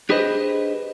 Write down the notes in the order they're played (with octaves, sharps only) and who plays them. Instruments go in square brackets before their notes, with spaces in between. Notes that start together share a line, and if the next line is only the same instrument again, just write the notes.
[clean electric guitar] D4 G4 G#4 B4 C5 D#5